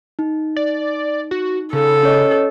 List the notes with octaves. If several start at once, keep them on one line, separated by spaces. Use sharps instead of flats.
D#4
D5
F#4
C#3 A4
C#4 C#5 D#5